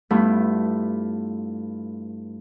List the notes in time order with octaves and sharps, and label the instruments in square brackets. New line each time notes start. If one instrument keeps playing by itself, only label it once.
[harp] G2 A3 B3 E4 F4